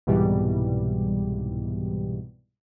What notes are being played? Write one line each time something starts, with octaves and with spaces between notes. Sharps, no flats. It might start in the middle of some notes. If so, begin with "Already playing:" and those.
C2 G#2 B2 E3 G3